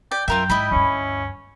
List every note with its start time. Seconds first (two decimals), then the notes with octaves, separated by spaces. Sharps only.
0.11 D5 G5
0.28 F#2 F4 A#4 E5 G5
0.50 G#2 E4 D#5 B5
0.71 D2 G2 C#4